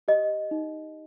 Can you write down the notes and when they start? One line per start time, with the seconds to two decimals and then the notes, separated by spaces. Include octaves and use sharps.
0.08 G4 D#5
0.51 D#4